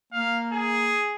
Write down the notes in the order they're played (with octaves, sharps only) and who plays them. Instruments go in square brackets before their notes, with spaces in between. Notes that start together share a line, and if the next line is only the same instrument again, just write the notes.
[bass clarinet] A#3 [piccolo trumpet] F5
[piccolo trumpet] G#4